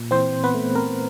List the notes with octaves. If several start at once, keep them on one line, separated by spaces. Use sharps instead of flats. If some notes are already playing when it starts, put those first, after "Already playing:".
Already playing: A#2
E3 C4 C5
C4
B3 B4
A3
C4 A#4